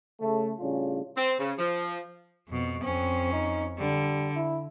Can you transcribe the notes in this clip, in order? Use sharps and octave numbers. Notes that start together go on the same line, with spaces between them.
C#3 A3
A2 C#3 G3 C#4 D4 F4
C4
C#3
F3
F2 B2
F2 C4 C#4
D#4
D3 G3
E4